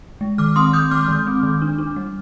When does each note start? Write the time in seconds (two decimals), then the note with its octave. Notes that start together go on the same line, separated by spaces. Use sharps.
0.21 G#3
0.38 D#3 D6 F6
0.56 C4 C6 D#6
0.73 D#3 D#6 G6
0.91 G#3 D6 F6
1.08 D#3
1.27 C4
1.43 D#3
1.62 D4
1.78 D4
1.96 G3